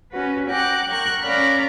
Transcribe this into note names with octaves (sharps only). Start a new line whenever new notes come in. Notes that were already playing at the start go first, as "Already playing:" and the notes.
C#4 F#4 B4
F#5 G5 A#5 D6 F#6
A#4 C#6 F#6
C#4 A#4 D5 F5 A#5 B5